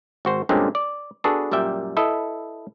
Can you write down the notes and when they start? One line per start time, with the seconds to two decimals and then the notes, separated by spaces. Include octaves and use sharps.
0.25 G#1 F#4 C5
0.49 G2 A#2 D3 G#3 C4 C#4
0.75 D5
1.24 B3 D4 F#4 G#4 A4 B4
1.51 F#2 A#2 G3 E5 G5
1.97 E4 A4 B4 D#5